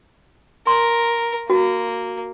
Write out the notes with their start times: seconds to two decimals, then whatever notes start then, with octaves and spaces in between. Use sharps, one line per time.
0.67 A#4 C6
1.50 A#3 F#4